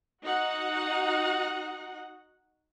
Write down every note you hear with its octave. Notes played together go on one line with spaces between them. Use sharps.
D#4 F#4 F#5